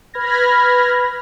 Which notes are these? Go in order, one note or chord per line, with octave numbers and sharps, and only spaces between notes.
B4 B5 F6 G#6 A#6